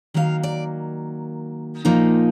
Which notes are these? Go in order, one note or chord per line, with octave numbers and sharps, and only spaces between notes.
D#3 F#3 A#3 F5
D5
A#2 F3 A#3 D#4